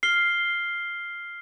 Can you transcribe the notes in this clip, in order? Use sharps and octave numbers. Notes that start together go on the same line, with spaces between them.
F6 C7 G7